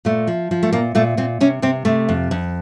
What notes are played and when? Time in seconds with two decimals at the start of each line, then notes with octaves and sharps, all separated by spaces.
0.05 A#2 A3
0.27 F3
0.51 F3
0.63 A3
0.73 A#2 A#3
0.95 A#2 A3
1.17 A#2 C4
1.40 C3 C#4
1.62 C3 C4
1.85 C3 A3
2.09 F2
2.31 F2